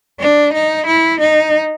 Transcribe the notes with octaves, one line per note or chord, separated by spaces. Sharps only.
D4
D#4
E4
D#4